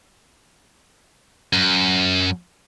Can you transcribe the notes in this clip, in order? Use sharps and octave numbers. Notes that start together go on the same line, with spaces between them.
F#2